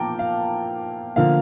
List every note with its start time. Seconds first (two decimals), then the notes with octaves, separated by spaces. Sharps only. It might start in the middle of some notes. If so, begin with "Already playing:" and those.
Already playing: A#2 F3 A#3 G5 A5 A#5 D6
0.19 F5
1.16 D3 F3 A#3 F5